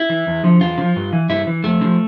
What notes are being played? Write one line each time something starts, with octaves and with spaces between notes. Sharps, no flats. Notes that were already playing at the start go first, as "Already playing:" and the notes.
Already playing: E4
E3
E2
D3 F3
E2 F4
D3
F3
G2
E3
G2 E4
E3
F2 A3
D3
F3